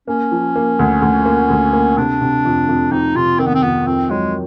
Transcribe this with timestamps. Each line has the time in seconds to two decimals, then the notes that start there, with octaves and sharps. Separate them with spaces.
0.07 A#3 C#4
0.32 F3
0.55 A#3
0.79 D2
1.02 D2
1.25 A#3
1.50 D2
1.73 A#3
1.97 C3 D4
2.21 C3
2.45 F2
2.69 F2
2.91 F2 D#4
3.15 C3 F4
3.39 D#3 C4
3.47 B3
3.54 C4
3.63 F2 B3
3.86 F2 C4
4.10 F#3 G#3